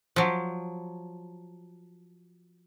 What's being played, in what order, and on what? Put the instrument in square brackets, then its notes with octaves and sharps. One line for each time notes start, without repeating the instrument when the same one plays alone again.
[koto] F3 F#3